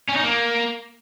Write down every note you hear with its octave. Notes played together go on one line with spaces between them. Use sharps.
C#4
D#4
A#3